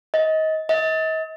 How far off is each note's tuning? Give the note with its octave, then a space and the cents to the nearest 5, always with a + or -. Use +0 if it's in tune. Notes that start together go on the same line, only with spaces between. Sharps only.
D#5 +25
D#5 +40